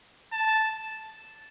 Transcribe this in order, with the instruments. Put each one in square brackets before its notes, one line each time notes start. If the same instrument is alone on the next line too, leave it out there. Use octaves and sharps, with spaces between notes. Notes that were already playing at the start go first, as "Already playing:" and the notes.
[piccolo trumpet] A5